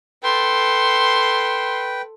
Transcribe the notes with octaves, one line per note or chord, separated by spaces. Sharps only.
A4 B4 G5 C6